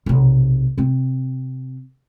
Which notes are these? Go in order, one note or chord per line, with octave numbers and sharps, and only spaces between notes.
B1 C3
C3 C4